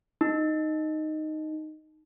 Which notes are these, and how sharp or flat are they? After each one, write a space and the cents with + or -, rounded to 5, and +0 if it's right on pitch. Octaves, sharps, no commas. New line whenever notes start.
D#4 -5